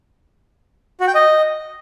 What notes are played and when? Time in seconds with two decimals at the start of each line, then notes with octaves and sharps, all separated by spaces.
1.00 F#4
1.08 G5
1.15 D#5